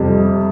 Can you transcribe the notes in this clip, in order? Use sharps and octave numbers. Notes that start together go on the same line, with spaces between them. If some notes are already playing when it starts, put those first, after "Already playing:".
Already playing: F2 C3 G3